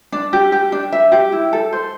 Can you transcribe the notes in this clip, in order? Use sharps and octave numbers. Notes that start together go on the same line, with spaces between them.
D4
G4
G4
D4
E5
G4
E4
A4
C5